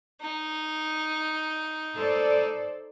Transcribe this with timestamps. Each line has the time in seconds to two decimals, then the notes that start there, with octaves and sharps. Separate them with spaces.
0.21 D#4
1.95 A4 C5 D5